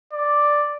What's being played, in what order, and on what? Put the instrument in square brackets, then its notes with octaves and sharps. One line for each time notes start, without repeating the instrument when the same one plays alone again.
[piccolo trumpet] D5